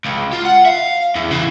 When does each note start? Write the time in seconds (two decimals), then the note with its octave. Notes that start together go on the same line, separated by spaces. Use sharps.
0.06 C#2
0.33 F4
0.46 F#5
0.66 E5 F5
1.16 E2
1.31 C#3 E3